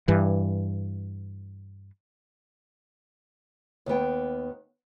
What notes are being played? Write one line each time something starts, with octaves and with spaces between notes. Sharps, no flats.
G2 E3
D#2 D#3 B3 G5